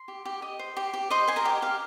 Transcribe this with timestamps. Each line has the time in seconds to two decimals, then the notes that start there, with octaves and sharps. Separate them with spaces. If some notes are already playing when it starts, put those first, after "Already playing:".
Already playing: C6
0.08 G4
0.25 G4
0.42 D#5
0.59 C5
0.77 G4
0.93 G4
1.10 C5 D#5 C6
1.28 C5 G#5
1.36 A#4 A#5
1.45 G4
1.62 G4 F5